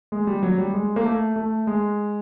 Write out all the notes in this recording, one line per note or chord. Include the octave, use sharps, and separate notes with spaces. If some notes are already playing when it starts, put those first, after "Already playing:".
G#3
G3
F#3
G3
G#3
A#3
A3
A3
G#3